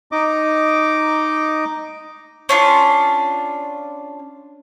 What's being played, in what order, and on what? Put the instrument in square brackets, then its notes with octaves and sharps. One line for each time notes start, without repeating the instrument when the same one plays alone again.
[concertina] D#4 D#5 D6
[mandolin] C#4 D4 F4